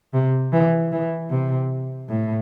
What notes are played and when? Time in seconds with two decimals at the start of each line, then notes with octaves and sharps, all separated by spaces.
0.13 C3
0.52 E3
0.92 E3
1.30 C3
2.09 A2